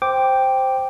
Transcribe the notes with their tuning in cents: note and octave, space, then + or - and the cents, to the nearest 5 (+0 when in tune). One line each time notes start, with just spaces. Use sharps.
C5 +0 G5 +0 D6 +0